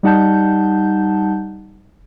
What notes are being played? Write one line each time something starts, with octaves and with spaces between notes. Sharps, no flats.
G3 D#4 F#5 A5 G6